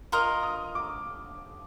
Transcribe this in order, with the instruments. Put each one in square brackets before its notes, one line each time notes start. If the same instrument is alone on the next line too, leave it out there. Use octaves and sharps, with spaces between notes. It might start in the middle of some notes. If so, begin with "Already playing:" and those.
[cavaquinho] F4 A#4 D#5 [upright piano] F6
[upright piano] D#6
D6